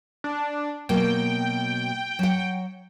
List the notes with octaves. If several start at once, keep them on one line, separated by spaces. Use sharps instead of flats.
D4
B2 F#3 A#3 G5
F#3 F#5